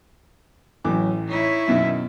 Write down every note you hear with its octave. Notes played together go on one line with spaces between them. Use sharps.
A1 E3 F#3 D6
D#4 E4 C#5
F#2 B2 D#3 E5